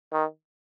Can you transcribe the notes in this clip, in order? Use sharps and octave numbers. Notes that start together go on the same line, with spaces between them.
D#3